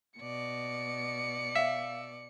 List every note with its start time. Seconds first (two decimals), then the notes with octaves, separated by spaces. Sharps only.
0.20 B2 D5 C#7
1.55 E5 F5